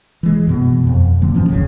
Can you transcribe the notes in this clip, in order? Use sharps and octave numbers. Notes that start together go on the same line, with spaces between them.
E3 G#3
F#2 B2 B3
F2
D3 F#3 A#3
G2 E3 F3 C#4
F1 C2 C#3